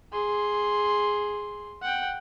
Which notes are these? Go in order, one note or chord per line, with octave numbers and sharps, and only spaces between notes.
G#4 C6
F#5 G5